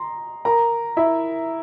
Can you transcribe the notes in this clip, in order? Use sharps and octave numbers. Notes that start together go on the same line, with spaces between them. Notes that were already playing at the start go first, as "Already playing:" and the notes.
Already playing: A#5 C6
A#4 A#5
E4 E5